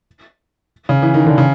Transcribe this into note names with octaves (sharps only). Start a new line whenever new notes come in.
C#3
E3
D#3
D3
C#3